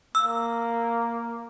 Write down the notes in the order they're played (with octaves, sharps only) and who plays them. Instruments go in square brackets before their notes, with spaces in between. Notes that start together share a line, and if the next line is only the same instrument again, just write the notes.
[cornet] A#3 [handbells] E6